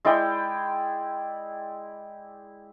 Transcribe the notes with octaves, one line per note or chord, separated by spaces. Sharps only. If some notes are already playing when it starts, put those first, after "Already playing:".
G#3 E4 D5 G5